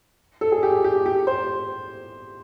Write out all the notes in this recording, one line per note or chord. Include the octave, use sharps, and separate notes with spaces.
A4
G#4
G4
G4
G4
C5